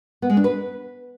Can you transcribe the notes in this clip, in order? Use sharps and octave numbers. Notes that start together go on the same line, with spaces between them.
B3
G#3
D4
B4